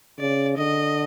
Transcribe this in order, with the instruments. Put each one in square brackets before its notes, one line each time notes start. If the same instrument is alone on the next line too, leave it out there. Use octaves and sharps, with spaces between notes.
[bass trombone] C#3 [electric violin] D5
[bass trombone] D3 [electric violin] D#5